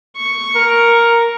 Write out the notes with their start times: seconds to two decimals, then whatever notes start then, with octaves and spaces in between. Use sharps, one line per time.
0.17 C#6
0.55 A#4